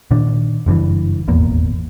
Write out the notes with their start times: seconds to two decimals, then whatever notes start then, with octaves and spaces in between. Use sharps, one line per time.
0.11 A#2 D#3 D4
0.66 F#1 G2 B2 E3
1.28 D#1 G#1 E2 A#3